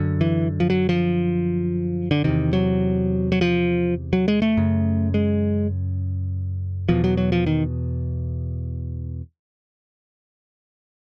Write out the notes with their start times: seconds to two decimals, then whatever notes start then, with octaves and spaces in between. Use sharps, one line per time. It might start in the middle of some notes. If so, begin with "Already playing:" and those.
Already playing: F#2 D3
0.21 E3
0.60 F3
0.70 F#3
0.89 F3
2.11 D3
2.24 E2 C3 D#3
2.53 F#3
3.32 F#3
3.41 F3
4.13 F#3
4.28 G#3
4.42 A3
4.57 F#2 C#3
5.14 G#3
6.89 E2 B2 F3
7.04 F#3
7.17 F#3
7.32 F3
7.47 D#3